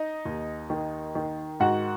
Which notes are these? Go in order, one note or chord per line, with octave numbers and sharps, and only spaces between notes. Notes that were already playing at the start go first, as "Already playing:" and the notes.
Already playing: D#4 D#5
D#2
D#3
D#3
G#2 F#4 F#5